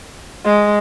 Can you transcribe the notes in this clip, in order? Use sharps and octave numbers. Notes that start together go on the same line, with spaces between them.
G#3